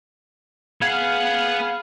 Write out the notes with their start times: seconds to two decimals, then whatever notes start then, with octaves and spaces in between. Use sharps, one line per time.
0.82 B3 G#4 F5 F#5 G#6